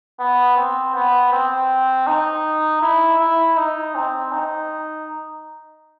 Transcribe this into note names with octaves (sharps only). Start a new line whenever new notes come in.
B3
C4
B3
C4
D#4
E4
E4
D#4
C4
D#4